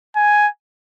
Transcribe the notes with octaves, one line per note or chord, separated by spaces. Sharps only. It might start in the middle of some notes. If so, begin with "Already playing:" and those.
G#5